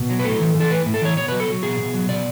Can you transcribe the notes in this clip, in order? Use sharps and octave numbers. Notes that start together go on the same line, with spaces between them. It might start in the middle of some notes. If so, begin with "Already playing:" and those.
Already playing: B2
F#3
B4
A2 A4
E3
E3
A4
A2 B4
A2
A4
E3 C#5
B2 C#5
F#3 B4
A4
F#3
B2 G#4
B2
F#3
B2 D5